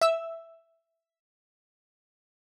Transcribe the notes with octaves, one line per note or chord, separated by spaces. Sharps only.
E5 E6